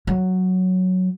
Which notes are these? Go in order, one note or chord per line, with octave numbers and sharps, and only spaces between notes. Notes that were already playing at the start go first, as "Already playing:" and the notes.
F#3